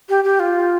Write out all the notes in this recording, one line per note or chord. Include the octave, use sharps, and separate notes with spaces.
G4
G4
F4